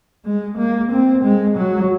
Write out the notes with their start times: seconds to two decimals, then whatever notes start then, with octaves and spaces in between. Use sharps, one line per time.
0.25 G#3
0.58 A#3
0.92 C4
1.24 G#3
1.57 F#3